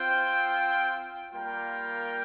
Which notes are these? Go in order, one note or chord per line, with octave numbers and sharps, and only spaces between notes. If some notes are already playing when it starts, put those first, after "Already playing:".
Already playing: C4 F4 C5 G5
G3 A#3 F4 A#4 G5